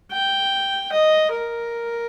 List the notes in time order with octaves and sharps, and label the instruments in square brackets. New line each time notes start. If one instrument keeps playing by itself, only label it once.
[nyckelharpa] G5
D#5
A#4